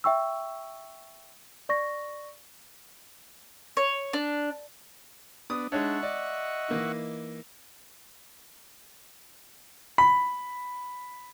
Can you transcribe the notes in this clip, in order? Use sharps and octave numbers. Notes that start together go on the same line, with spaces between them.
E5 G5 C#6 E6
D5 C#6 A#6
C#5
D4
B3 D4 D#6
G#3 D4 D#4 C#5 E5 F#5 C#6
D5 D#5
E3 A#3 D#4
B5